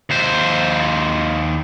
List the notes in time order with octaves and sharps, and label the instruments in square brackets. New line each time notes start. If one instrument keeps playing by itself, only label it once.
[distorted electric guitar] D#2 C5